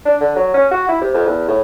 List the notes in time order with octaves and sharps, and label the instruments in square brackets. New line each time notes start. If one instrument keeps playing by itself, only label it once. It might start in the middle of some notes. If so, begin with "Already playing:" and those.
[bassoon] D4
D3
F#3
C#4
F#4
E4
C3
F2
E2
A2